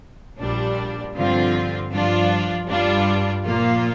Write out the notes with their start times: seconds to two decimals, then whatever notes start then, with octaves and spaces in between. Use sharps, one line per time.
0.39 A#1 A#2 G3 D4
1.15 G2 D3 F3 C4 F4
1.91 G2 F3 D4 F4
2.68 G2 G3 D4 F4
3.45 A#2 F3 A#3 F4